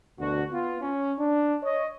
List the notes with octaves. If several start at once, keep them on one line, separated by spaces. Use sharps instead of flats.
D2 B2 D4 F#4
B3 F4
C#4
D4
C#5 D#5